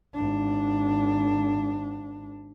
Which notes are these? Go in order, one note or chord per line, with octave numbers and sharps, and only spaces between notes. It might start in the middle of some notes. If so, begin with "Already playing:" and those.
G#1 D4